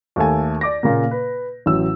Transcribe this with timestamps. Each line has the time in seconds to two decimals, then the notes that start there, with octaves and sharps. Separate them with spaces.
0.16 D#2 A3 A4 G#5
0.61 D5 D6 A#6
0.83 A#2 C#3 A#3
1.11 B4
1.66 A1 F#3 E6